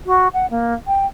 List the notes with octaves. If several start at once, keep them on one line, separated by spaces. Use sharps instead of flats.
F#4
F#5
A#3
G5